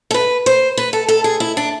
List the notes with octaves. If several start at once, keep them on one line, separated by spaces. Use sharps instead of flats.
A4
B4
C5
B4
A4
A4
G#4
E4
D4